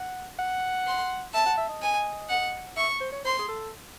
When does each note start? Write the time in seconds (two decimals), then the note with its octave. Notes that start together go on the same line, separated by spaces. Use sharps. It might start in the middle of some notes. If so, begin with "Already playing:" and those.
Already playing: F#5
0.39 F#5
0.87 C6
1.33 E5 A5
1.46 F#5
1.57 E5
1.69 D#5
1.81 G#5
2.29 F#5
2.76 E5 C#6
3.01 C5
3.12 C#5
3.24 C5 C6
3.39 G#4
3.49 A4